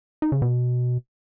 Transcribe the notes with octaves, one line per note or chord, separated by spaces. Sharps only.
D#4
C#3
B2